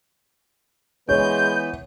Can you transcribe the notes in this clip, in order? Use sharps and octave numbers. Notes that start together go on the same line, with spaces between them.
E3 G#3 B3 B4 C#5 G6